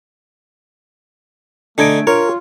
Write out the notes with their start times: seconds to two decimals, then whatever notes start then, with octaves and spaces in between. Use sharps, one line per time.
1.78 D3 A3 D4 D#4 G#6 D7
2.07 F4 A#4 C#5